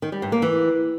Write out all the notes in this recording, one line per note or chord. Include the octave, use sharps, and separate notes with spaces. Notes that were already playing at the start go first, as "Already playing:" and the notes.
D#3
G3
G2
A#3
E3